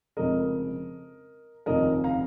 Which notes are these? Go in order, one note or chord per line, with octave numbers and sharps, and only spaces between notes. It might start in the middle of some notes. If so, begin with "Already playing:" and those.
F1 F2 C#3 G#3 A#4 D#5
F1 D#2 C#3 F3 A#4 D#5
F5 A#5